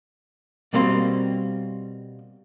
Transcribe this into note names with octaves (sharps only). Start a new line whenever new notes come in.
B2 G3 A#3 C4 C5 C6